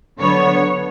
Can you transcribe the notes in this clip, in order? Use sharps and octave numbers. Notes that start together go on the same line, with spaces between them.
D3 F#3 B3 C#5